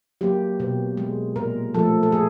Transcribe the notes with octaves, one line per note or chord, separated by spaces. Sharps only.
F#3 A#3 G4
B2
G#3
A#2 A#4
F3 A3 A4
A4
A#2 G#4